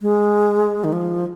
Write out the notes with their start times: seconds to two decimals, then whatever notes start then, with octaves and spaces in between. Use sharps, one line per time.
0.02 G#3
0.84 D#3
0.93 F3